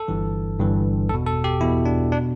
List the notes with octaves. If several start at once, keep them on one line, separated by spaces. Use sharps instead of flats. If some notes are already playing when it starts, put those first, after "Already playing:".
Already playing: A4
G1 G2 E3
G1 G2 E3
E2 B2 A4
A4
G4
E2 B2 E4
D4
B2 D4